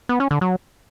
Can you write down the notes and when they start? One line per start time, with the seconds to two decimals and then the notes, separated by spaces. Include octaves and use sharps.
0.09 B3
0.20 C#4
0.31 D3
0.41 F#3